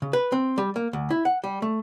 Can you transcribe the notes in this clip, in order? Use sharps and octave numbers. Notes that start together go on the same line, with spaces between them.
C#3
B4
C4
G3
A#3
D2
E4
F#5
G3
A3